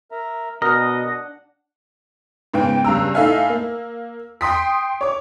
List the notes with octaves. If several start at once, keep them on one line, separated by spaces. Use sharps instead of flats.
A#4 E5 A#5
B2 D4 A#4 D#5 F#5
G#2 C#3 B3 G5
G2 C#3 A#5 E6
A2 D#4 A4 E5 F5 G#5
A#3
G5 C6 D#6 B6
C#5 D6